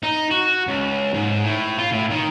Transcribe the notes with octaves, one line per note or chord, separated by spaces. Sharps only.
D#4
F#4
C#2
G#2
A2
F4
A2
D#3